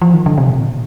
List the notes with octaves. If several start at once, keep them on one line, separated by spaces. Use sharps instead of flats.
F3
D#3
D3
C3
A#2